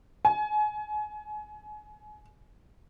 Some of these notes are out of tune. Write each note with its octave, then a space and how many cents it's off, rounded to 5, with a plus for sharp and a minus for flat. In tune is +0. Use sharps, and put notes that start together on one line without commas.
G#5 +30